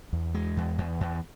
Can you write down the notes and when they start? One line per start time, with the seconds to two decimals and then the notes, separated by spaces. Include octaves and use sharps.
0.13 E2
0.34 G#3
0.57 E2
0.78 E2
1.01 E2